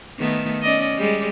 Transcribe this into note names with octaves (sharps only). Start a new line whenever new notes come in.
D#3 A3 B3
C#4 D5 D#5
G3 G#3